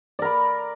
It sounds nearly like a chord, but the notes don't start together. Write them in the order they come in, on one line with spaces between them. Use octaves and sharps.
D5 A#4 B5